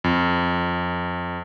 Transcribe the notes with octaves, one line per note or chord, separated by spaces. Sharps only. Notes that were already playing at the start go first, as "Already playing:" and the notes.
F2